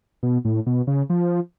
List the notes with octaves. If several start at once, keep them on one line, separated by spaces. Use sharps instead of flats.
B2
A2
B2
C#3
F3